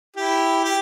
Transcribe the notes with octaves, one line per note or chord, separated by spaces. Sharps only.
E4 G4
G4